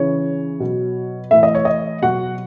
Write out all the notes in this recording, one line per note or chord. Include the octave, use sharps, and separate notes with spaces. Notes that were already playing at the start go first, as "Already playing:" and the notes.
Already playing: C#3 E3 C#5
B2 F#3
A2 E3 E5
D#5
C#5
D#5
B2 F#3 F#4 F#5